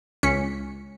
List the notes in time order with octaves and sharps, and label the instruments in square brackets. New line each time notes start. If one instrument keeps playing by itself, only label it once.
[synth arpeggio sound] C#2 C#4 B6 C#7